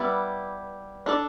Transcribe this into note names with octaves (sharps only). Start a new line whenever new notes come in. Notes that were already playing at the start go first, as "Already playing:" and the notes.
Already playing: G3 B3 E4 B4 D5
D4 A4 D5